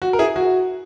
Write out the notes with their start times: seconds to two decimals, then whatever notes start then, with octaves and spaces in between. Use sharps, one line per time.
0.02 F#4
0.13 A#4
0.19 E4 G#4
0.36 F#4